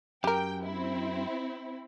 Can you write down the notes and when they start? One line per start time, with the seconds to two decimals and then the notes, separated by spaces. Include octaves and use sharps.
0.24 F#2 G4 A#4 G5
0.63 C4 E4